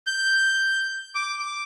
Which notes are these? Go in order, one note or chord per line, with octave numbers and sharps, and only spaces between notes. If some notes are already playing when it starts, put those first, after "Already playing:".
G6
D6
D6